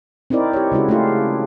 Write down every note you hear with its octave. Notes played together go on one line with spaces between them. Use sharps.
C4 D#4 E4 A#4 D5
G4 C#5
C#3 G#3 E4 F#4
A3 C#4 E4 F4 G4 G#4